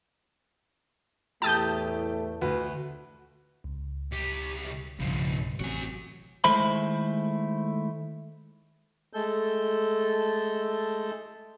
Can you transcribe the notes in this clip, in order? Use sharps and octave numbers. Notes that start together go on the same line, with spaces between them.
E2 A2 A3 G4 A5 D#6 G6
D2 F#4 B4
C#2
C2 G4
B1 G2 C#3 F3
A1 C3 F#3 F#4 G#5
D#3 G#3 A3 E4 C5 B5
G#3 A3 A4 G6